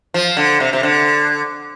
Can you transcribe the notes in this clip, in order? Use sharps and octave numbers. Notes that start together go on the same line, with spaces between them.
F3
D3
C3
C3
D3